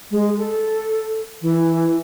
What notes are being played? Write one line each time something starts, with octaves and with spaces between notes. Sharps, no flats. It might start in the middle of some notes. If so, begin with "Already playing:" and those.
G#3
A4
E3